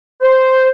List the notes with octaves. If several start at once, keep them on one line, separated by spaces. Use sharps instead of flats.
C5